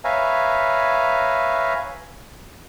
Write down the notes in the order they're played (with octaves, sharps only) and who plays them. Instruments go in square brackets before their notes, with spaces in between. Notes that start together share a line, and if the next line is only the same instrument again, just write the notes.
[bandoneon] B4 C#5 E5 F5 G#5 A#5